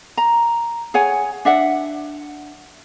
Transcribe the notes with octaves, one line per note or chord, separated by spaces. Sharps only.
A#5
G#4 C#5 F#5 G#5
D4 E5 F#5